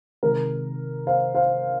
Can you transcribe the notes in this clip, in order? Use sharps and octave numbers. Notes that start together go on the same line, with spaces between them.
C3 D#3 G#3 A#4
C5 F5
C5 F5